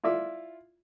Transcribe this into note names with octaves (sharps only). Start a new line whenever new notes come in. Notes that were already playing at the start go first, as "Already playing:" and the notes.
E4 F4 D5 E5